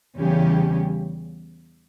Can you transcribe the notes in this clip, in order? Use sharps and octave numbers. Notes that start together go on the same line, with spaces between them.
E2 C#3 G3 C#4 G4